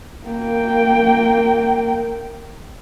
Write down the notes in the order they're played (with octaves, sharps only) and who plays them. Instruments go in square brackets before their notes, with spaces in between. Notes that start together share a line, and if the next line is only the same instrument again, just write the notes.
[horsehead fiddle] A#3 G5